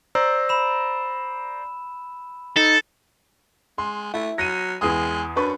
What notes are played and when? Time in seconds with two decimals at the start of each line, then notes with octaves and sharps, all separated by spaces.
0.15 C5 D5 A#5 E6
0.49 B5 E7
2.56 D#4 A4
3.78 G#3 C6
4.14 A3 E4
4.38 F#3 A#6 D#7
4.81 E2 G#3 G#4 D#6
5.36 F#2 D4 B4 C#6